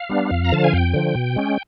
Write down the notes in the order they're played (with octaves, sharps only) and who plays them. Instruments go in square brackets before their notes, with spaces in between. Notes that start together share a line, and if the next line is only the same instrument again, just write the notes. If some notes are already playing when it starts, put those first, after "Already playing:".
Already playing: [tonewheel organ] F5
G3 B3 D4
F2
A#5
D3 F3 A5
G#5
F2 G5
D3 F3
B2
G#3 C#4